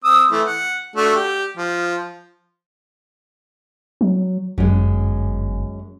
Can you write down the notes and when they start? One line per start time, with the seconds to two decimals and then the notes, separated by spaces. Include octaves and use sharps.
0.04 C4 D#6 E6
0.31 E3 A3
0.44 F#5
0.96 A3 D4 F#4
1.16 G4
1.57 F3
4.01 F#3
4.58 G1 F#2 G#3